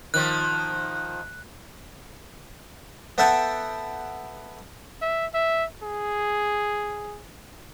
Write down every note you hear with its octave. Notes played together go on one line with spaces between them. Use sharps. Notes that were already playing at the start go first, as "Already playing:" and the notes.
D#3 F3 F#6
B3 A4 E5 F#5 G5 A5
E5
E5
G#4